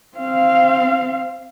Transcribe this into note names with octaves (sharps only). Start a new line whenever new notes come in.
C4 F5